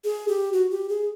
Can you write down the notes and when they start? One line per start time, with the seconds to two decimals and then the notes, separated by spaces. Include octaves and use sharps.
0.04 G#4
0.28 G4
0.53 F#4
0.71 G4
0.89 G#4